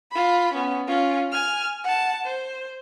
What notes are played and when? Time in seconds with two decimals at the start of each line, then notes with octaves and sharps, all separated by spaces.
0.12 F4 B5
0.54 B3 C#4
0.87 C#4 F4
1.32 G#5 F6
1.84 F#5 A5
2.26 C5